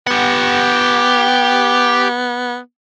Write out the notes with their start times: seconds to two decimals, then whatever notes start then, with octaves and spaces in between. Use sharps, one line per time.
0.07 B3 G4 F#5